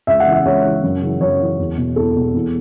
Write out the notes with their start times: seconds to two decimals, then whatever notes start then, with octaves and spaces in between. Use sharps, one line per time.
0.07 C#2 E5
0.20 F#5
0.27 C#3 E3
0.33 E5
0.45 C#2 C#5
0.64 C#3 E3
0.83 F#2
1.02 C#3 E3
1.20 F#2 C#5
1.40 C#3 E3
1.59 E2
1.78 B2
1.96 E2 A4
2.16 B2
2.34 E2